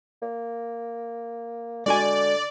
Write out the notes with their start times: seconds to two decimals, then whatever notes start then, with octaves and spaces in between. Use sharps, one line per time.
0.22 A#3
1.86 D3 G#3 F#4 D5 G#5